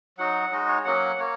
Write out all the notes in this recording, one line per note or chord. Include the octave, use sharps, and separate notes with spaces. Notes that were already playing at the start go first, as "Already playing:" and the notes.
F#3 D#4 F#4 F#5
G#3 D#4 F#4 D#5
C#5
F#3 A#3 C#4 F#5
A#3 C#5